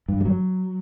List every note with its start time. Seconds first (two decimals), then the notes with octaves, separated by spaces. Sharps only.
0.09 G2
0.21 G3
0.25 F#3